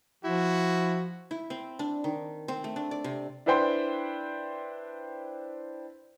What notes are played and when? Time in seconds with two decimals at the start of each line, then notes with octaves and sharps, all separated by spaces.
0.24 F3 E4 F#4
1.31 E4
1.50 C4
1.79 D4
2.04 D#3
2.48 C4
2.64 A3
2.76 D4
2.91 D5
3.04 C3
3.46 D4 E4 B4 C5 G5 C6